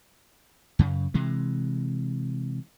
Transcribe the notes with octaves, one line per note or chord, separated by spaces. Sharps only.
F#2 C#3
C3 E3 G#3